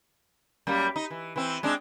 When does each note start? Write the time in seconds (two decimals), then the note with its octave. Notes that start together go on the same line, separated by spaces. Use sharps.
0.67 F#2 G3 A#3
0.96 D#4
1.11 E3
1.36 E3 C4
1.63 G#3 C4 D4